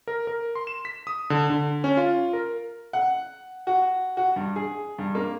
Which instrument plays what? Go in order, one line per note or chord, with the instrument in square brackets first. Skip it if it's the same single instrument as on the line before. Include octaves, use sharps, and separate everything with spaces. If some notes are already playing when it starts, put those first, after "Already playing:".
[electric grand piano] A#4
A#4
C6
E7
B6
D#6
D3
D3
C#4
F4
A#4
[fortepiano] F#5
F#4
F#4
G2
G#4
G2
A#3